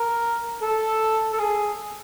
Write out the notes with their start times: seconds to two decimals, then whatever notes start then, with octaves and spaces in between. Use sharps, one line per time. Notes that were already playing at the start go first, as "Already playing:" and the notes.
Already playing: A#4
0.62 A4
1.33 A4
1.39 G#4